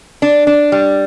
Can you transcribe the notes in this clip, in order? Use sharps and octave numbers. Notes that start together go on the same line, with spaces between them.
D4
D4
G3